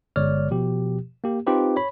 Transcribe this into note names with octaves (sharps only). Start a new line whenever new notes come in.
G1 D3 G#3 C#5 D5 F6
B2 F3 G4
A#3 G4
C4 D#4 F4 G4 B4 C5
C#5 B5